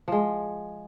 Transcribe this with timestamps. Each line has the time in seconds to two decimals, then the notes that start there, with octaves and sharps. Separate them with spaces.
0.08 F3 G#3